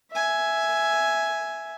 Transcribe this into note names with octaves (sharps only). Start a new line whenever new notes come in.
E5 G#5